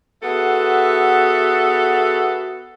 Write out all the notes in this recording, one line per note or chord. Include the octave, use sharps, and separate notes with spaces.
B3 F#4 G#4 A4 E5